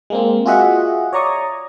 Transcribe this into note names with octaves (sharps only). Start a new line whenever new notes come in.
G#3 A#3 C4
F4 F#4 G#4 D#5 E5 F#5
C#5 D5 A#5 C#6 D#6